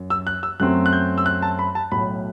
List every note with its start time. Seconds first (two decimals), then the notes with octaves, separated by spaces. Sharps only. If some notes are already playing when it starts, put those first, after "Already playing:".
Already playing: F#2 F#3
0.10 E6
0.27 F#6
0.43 E6
0.60 F#2 F#3 A3 C4 F#6
0.86 F#6
0.93 G6
1.18 E6
1.26 F#6
1.42 A5
1.59 B5
1.75 A5
1.92 B1 A2 F#3 B5